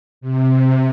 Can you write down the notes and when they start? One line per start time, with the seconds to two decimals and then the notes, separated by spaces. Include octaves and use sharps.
0.21 C3